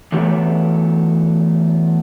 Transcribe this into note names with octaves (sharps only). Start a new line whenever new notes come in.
E3 F#3 A3 B3 G4 C#5